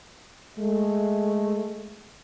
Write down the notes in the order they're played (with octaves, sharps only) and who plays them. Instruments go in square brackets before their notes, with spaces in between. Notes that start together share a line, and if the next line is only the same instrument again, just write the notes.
[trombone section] G#3 A3